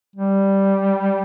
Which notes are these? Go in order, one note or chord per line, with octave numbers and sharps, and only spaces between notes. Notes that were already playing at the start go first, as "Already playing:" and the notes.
G3